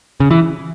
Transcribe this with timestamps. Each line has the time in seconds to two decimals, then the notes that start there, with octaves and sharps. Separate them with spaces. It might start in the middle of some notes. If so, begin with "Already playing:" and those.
0.20 C#3
0.31 E3